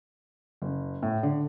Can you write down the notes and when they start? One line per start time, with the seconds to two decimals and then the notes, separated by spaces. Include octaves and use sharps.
0.62 F#1
1.02 A2
1.23 D3